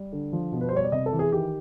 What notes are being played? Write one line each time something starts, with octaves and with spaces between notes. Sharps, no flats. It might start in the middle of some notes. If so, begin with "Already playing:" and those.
Already playing: G3
D3
F3
B2
B4
C5
G3 C#5
D5
C3 D#5
A4
E3
G#4
D#3 G4